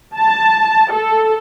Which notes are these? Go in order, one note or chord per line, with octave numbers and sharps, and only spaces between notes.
A5
A4